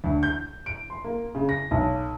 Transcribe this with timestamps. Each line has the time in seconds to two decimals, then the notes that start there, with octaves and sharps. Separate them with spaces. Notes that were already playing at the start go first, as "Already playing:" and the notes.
0.04 D2
0.23 G6
0.66 D7
0.90 C6
1.04 A#3
1.35 C#3
1.49 A#6
1.71 B1